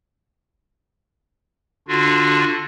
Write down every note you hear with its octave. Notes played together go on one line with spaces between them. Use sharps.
D3 D4 F4 F#4